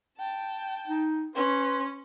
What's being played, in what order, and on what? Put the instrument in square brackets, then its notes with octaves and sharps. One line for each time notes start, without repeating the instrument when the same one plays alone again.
[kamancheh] G5 A5
[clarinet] D#4
[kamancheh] C#4 [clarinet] B4 [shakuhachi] C6